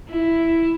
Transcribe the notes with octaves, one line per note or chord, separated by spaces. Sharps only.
E4